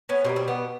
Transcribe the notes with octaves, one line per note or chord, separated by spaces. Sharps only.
B3 C#4
B2 G3 A#3 C4
C4
B3